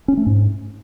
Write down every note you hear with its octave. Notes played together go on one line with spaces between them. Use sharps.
C#4
A3
G#2